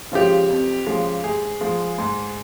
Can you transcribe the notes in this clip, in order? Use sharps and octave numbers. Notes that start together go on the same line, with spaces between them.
C#3 F3 G#3 G4
F2
C#3 F3 G#3
G#2 G#4
F3 G#3
G#2